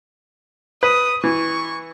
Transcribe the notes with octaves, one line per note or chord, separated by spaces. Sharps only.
B4 D#6
E3 C#6